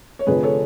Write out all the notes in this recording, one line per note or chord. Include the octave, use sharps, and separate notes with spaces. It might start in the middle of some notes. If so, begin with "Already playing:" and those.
C#5
F1 F2 D3 F3 G#4 B4
A4 C#5